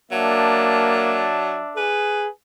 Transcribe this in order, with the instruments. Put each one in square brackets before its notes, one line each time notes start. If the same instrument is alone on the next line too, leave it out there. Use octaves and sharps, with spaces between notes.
[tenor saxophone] F#3 [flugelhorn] A#3 [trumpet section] D4 E5 A5
[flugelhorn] G#4 [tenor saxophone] B4